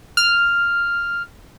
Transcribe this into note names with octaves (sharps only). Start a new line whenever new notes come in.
F6